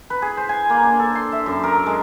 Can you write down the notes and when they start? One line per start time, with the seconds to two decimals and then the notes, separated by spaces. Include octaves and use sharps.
0.10 B4
0.22 G#4
0.37 C5
0.49 G#5
0.70 A#3
0.83 D4
0.99 A4
1.15 C6
1.32 E5
1.46 F#2
1.64 A#4
1.86 G#3